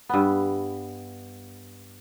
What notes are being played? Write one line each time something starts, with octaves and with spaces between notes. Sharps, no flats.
G2 B3